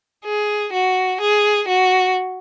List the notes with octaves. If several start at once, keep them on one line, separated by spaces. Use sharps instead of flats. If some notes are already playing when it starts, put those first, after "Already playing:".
G#4
F#4
G#4
F#4